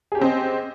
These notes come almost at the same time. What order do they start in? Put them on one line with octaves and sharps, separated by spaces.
G#4 G4 C#4 C4 D#5